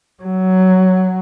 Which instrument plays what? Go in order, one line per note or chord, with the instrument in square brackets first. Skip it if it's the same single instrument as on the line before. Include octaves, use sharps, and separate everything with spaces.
[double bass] F#3